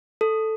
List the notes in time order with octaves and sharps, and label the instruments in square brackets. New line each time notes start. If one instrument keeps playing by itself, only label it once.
[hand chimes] A4